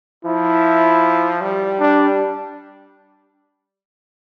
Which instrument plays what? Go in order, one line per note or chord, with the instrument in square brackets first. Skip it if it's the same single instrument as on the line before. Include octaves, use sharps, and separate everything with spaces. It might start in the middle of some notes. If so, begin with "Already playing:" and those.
[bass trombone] F3 [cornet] E4
[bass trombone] G3
[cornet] D4